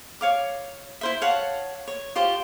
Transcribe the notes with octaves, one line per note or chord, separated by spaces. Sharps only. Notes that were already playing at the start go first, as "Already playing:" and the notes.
C#5 F5 D6
E4 C5 E5
C#5 F5 F#5 A5
C#5
F4 G4 C5 G5